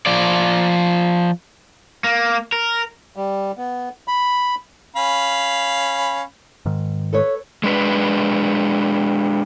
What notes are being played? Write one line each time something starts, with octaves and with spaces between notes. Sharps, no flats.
F3 D5
A#3
A#4
G3
B3
B5
C#4 F5 B5
G#2 D#3
A4 B4 C#5
G#3 D4 B4